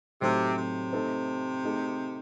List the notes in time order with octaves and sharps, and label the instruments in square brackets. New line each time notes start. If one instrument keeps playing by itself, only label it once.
[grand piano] A2 F#3 A3 D#4 [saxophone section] C3
[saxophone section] C3
[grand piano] A3 C4 D#4 A4 C5
A3 D#4 G#4